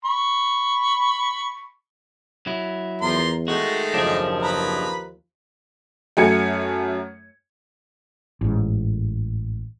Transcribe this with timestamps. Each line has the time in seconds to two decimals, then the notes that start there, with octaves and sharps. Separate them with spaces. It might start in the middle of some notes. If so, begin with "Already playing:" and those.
0.05 B5 C#6
2.47 F#3 E4
3.01 E2 F3 A#4 C6
3.48 D#3 G#3 A3 F#4
3.94 F#1 D#2 F3 D4 G#4
4.42 B4 A#5 B5
6.17 F#2 A3 F#4 G#5 G#6 C#7
8.41 A1 G#2